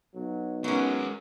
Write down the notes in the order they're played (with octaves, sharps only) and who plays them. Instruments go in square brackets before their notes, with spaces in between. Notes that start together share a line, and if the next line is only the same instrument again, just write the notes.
[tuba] B1 [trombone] F#3
[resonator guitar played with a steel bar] F#3 C#4 [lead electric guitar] G#3 A#4 [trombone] B3